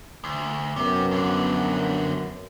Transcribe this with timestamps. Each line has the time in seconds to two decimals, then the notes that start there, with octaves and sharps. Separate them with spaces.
0.24 D2
0.76 F#2 C3 B3
1.11 F2 D3